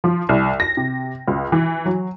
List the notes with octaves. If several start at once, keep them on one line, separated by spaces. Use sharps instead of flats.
F3
C2
A#6
C3
C#2
E3
F#3